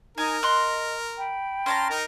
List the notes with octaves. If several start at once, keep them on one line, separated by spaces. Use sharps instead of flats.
D#4 A#4 G#5 A#5
D#5 C6 F#6
G5 B5
C#4 A5 A#5 C6
D#4 A#4